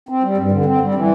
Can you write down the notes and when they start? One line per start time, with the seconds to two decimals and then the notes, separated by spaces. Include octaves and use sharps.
0.09 C4
0.23 G3
0.37 G2
0.51 D3
0.65 C4
0.81 G3
0.95 E3